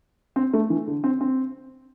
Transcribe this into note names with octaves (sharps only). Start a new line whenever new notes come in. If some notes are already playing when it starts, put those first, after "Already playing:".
C4
A3
E3
D3
C4
C4